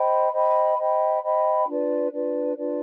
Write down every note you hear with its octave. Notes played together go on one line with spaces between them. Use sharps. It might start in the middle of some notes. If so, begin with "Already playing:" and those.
Already playing: C5 D#5 G5 B5
C5 D#5 G5 B5
C5 D#5 G5 B5
C5 D#5 G5 B5
D4 F4 B4 D5
D4 F4 B4 D5
D4 F4 B4 D5